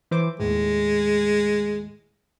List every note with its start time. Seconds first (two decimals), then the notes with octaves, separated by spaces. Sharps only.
0.11 E3 C5 D6
0.40 D#2 A2 G#3